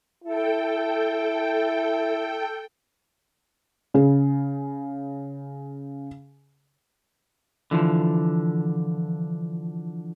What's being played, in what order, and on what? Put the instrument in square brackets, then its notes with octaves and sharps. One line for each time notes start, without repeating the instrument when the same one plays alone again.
[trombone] E4 [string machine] A4 G5
[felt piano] C#3 G#4
[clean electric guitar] D3 E3 F3